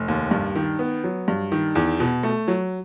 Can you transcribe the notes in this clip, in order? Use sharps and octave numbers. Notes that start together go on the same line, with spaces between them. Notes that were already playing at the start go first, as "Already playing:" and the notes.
Already playing: F1
D#2
G2
D#3
B3
F#3
G2
D#3
E2
B2
A3
F#3